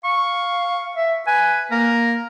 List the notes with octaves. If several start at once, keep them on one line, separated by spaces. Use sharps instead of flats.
F5 C#6
E5
B4 G#5
A#3 A#4